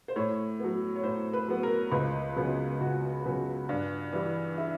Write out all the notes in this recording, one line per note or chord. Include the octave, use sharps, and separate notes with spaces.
C5
A2 C#5
F#3 B3
C#5
A2 C5
B4
F#3 B3
A#4
C#2 B4
C#3 F#3 B3
C#2 F#4
C#3 F#3 B3
G2
E3 G3
E4